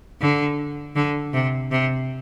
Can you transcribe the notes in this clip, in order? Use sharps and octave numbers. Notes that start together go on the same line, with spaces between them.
D3
D3
C3
C3